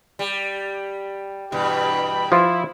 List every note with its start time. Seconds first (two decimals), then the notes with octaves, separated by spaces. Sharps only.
0.19 G3
1.52 G2 B2 E3 G5 B5
2.32 F3 E4 F4